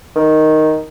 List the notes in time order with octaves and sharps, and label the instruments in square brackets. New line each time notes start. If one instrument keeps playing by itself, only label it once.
[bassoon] D#3